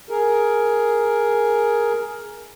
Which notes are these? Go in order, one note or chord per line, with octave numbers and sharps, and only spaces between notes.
G#4 A#4